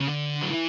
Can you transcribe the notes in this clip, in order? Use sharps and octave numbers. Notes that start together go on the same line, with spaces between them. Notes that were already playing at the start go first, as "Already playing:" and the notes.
C#3
D3
F#3
E3